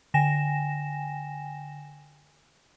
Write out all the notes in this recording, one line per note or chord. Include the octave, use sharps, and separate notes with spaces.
D3 G5 G#5 A#6 E7